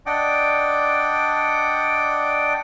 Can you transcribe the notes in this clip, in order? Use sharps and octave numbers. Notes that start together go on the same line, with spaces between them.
D4 D5 D#5 F#5 G5 D6